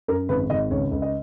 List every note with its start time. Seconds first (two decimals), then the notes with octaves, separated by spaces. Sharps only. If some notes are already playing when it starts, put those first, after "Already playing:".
0.08 F#2 A#4
0.29 G#1 B4
0.50 G#1 D#5
0.71 C#2 C#5
0.92 C#2
1.02 D#5